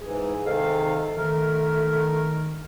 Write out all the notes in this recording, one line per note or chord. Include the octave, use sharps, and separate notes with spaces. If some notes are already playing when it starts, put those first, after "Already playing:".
G#2 E3 G#4
G#2 C3 D#3 A4 F5
D#3 A3 A#4